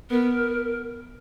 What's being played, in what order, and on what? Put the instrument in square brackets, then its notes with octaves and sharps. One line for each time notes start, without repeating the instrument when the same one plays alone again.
[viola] B3 [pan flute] A#4